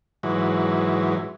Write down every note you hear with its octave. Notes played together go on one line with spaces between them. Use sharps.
G#2 E3 F#3